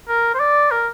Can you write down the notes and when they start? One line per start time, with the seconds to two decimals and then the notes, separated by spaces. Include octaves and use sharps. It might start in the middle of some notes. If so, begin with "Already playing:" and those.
0.08 A#4
0.34 C5
0.40 D5
0.71 A#4